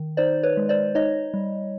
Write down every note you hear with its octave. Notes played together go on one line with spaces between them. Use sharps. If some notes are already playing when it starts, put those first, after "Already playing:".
Already playing: D#3
D#4 C5 D5
B4 C#5
G#3
C5 D5
D#4 C#5 D#5
G3